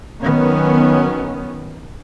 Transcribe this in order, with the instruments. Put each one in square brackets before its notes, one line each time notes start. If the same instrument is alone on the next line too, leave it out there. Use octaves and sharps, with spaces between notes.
[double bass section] D#3 F#3 B3 C#4